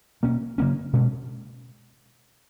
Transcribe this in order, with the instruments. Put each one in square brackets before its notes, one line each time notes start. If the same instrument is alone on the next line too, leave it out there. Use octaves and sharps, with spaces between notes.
[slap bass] B2 A#3 C#4
C#3 F#3 A#3 C#4
B2 G#3 C#4